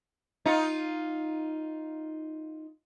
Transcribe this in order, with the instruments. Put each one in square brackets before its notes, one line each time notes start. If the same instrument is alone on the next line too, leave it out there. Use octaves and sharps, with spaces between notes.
[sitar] D#4 F4